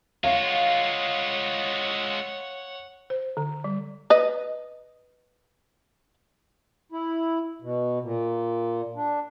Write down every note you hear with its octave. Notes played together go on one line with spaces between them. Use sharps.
G#3 F4 C#5 F5 F#5
C5
D3
G3
B4 D#5
E4
B2
A#2
D4